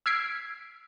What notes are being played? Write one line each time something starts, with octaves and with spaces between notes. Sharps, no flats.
E6 F6 G#6 B6 C7 D7